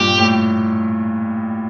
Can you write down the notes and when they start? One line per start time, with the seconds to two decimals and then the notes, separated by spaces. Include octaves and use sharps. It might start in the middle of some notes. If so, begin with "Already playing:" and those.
Already playing: G2 A#2 G4
0.18 A2